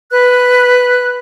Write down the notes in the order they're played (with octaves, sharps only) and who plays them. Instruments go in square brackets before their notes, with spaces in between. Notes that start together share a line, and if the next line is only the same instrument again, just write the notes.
[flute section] B4 F#6